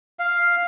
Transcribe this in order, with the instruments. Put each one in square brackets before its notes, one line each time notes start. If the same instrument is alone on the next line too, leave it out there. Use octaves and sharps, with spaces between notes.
[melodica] F5